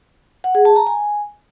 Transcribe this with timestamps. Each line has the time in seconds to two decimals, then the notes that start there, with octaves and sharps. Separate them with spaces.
0.44 F#5
0.55 G#4
0.65 A5
0.76 A#5
0.87 G#5